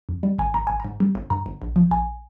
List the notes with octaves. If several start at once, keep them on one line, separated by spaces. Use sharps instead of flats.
F2
G3
G#1 G#5
G#1 A#5
G#1 G#5
G#2 A#5
G3
G1
G2 A#5
G1
A#1
F3
A#1 G#5